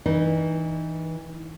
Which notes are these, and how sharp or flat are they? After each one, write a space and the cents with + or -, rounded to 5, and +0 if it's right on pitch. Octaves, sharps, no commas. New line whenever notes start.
E3 -25 D#4 -20